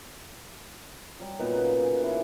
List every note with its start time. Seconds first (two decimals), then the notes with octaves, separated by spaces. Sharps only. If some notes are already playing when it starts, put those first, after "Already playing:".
1.20 F#3 G3 G4
1.39 A#2 B3 D#4 F#4
1.55 C#3 F#5
1.83 G#5 C#6
2.00 D#3 E3